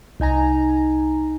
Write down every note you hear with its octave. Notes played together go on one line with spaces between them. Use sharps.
C2 D#4 G#5 A#5